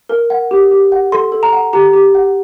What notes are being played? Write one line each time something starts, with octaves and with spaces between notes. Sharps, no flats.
A#4
F#5
G4
G4
F#5
A4 C6
A4
A#5
F#5
G4 A#5
G4
F#5